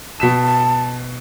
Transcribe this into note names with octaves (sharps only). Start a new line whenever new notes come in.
B2 A5 B6 E7